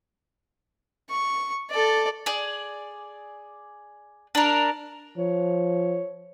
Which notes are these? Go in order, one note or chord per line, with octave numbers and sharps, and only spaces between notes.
C#6
A4 D5
G#4 D5
D4 A#4
F3 C#5